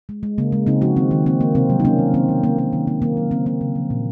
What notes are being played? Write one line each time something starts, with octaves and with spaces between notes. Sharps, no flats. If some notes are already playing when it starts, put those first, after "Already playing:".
G#3
G#3
C#3 A#3
G#3
C#3 C4 D#4
F3 D#4 F#4
D#3 C4
D#3
A#3 C4
A#3
C3 C4
F#3
D#4
A#3 C#4
D#3
D#3 C4
D#3
A#3
A#3
D#3
A#3
D#3 A#3
F#3
C#3 C4
A#3
C#3
F3
A#2